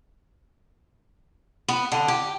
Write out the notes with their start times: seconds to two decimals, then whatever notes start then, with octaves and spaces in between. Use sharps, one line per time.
1.68 B3
1.92 D3
2.08 G4